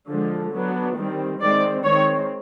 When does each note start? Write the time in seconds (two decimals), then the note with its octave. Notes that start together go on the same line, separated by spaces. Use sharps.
0.08 D3 F3 G#3
0.52 F#3 B3 D4
0.97 D#3 G3 C4
1.40 D#3 G#3 C4 D5
1.84 D#3 G#3 C4 C#5